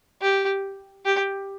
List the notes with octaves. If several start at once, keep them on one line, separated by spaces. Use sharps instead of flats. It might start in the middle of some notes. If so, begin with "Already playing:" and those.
G4
G4